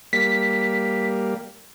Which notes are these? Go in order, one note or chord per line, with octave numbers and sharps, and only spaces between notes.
G3 A#3 B6